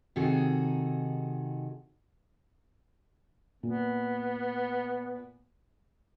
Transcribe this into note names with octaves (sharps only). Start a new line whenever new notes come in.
C3 D#3 D#4 F#4 G#4 A4
A#2 B3